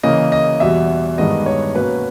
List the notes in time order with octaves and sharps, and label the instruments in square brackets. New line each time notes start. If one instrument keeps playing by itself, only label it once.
[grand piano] C#3 E3 A#3 D#5
D#5
E2 B2 G3 E5
G2 D#3 G#3 B3 D#5
C#5
B2 A#3 C#4 B4